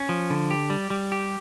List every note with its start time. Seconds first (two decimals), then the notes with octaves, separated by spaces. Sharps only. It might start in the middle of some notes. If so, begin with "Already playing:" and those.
Already playing: C#4
0.09 F3
0.30 D3
0.51 G4
0.70 G3
0.90 G3
1.12 G4